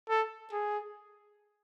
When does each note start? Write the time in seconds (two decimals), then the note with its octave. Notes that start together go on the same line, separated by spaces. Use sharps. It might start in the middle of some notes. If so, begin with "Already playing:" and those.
0.09 A4
0.53 G#4